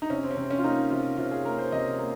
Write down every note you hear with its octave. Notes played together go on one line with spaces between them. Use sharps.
D#4
C3 C#4
C4
C#4
C3 C4
C#4
F4
A#3 D#4
C3 F4
C3 F4
G#4
A#3 A#4
C5
C3 D#5
A#3